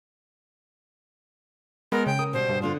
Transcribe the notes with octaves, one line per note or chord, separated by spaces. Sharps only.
G#3 B3 A#4
C#3 G5
A#4 D#6
B2 G3 C5
G2
D3 B3 D4 F4